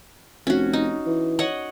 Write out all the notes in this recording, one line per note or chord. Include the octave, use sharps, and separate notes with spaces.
F1 C#4 F#4
D#4
E3
C#5 D#5 F#5